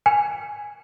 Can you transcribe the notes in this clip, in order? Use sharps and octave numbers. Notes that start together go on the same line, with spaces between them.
G#5